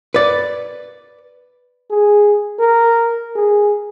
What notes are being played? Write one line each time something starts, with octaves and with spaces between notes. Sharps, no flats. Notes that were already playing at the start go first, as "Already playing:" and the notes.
B4 D5
G#4
A#4
G#4